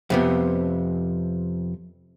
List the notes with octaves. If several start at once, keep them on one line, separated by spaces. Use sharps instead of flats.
F2 C3 B3